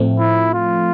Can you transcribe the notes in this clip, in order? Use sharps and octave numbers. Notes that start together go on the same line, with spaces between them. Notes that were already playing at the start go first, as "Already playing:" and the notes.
Already playing: A2 F3 A3 C4
E4
F4